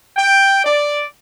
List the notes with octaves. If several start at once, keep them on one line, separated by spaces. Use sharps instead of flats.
G5
D5